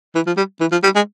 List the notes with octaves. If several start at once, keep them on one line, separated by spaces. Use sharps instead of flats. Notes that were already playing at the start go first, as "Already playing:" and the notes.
E3
F3
G3
E3
F3
G3
G#3